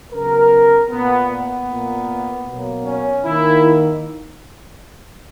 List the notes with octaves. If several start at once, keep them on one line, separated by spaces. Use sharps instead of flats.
C#3 F#3 B3 A#4
A#2 A#3 B3
B3
A#2 A#3
B2 F#3 A#3
C#4
D#3 A#3 E4